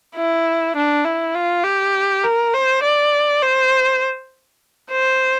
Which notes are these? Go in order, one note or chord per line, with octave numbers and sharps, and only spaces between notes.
E4
D4
E4
F4
G4
A#4
C5
D5
C5
C5